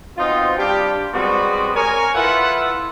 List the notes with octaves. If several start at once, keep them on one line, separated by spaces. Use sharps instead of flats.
B2 C4 D#4 F4
G3 D4 F4 G4
G3 G#3 B3 C4 F#4
A#4 C#5 G#5
E4 F4 A4 B4 E5 F#5